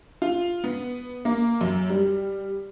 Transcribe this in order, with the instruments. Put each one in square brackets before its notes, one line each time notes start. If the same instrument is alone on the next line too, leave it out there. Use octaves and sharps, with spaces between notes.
[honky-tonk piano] F4
B3
A#3
F#2
G3